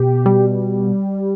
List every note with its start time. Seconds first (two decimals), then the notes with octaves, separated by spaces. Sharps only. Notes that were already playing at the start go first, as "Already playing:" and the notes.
Already playing: B2 G4
0.26 G3